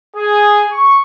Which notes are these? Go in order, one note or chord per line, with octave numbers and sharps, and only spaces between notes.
G#4
C#6